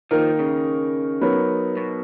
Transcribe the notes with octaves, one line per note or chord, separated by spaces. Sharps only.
D#3 F3 A#3 D#4 A#4
C#3
F#3 B3 D#4 A#4 C#5
B2